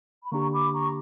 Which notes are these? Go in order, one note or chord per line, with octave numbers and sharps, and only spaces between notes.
B5
D3 A#3 D4 G4 A#5 C#6
B5 D6
A#5 C#6